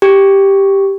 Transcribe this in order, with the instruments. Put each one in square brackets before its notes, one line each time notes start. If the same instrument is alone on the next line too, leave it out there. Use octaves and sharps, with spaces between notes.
[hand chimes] G4